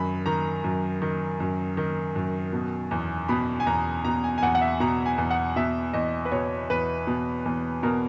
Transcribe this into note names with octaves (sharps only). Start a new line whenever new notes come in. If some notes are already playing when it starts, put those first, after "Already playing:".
Already playing: F#2 D#3 B5
D#3 A#5
F#2
D#3
F#2
D#3
F#2
B2
E2
B2 B5
G#5
E2 A#5
B2 A#5
G#5
G#5
E2 F#5
F#5
E5
B2 A#5
G#5
E2
F#5
B2 E5
E2 D#5
B4
B2 C#5
E2 B4
B2
E2
B2 A#4